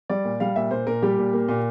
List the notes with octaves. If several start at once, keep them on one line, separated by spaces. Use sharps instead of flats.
G3 D5
A#2
G3 F5
A#2 E5
A#2 C5
A#2 A#4
G3 G4
A#2
A#3
A#2